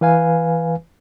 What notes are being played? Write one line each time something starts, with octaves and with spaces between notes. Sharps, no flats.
E3 B4 F5 G#5